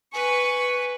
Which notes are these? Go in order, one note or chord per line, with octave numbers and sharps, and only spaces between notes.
B4 G#5 C#6